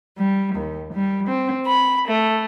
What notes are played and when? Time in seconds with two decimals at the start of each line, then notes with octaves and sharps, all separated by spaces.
0.16 G3
0.54 D#2
0.92 G3
1.28 C4
1.64 B5
2.06 A3